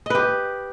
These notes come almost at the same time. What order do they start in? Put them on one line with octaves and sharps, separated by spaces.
D#5 B4 G4